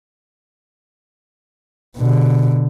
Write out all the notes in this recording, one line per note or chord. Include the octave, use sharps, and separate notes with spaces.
B2 D3